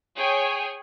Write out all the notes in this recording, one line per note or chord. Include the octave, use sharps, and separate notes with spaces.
G#4 C#5 G5 G#5